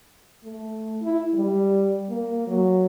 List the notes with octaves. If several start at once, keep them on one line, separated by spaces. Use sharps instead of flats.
A3
E4
G3
A#3
F#3